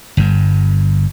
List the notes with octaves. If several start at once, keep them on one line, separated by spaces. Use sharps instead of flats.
G1 G2